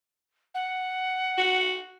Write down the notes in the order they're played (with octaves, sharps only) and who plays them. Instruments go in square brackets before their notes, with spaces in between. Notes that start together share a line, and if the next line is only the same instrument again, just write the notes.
[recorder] F#5
[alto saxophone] F#4